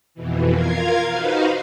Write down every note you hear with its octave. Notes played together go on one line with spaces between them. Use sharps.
F2 B2 E3
F4 A#4 F5 G#6
D#4 F#4 B4 C5 F5